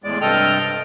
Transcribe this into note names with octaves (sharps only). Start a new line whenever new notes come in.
E2 A2 G#3 D5
G2 C3 A4 D#5 G5 F6